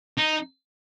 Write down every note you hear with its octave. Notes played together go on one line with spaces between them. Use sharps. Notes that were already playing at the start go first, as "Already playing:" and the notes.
D#4